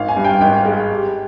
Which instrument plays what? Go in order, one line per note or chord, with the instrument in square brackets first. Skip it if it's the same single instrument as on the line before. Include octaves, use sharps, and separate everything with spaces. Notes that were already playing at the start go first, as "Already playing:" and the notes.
Already playing: [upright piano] G#1 F5
G#5
G2
G5
G#1 G5
G#3
G3